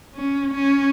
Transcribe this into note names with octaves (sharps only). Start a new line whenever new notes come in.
C#4
C#4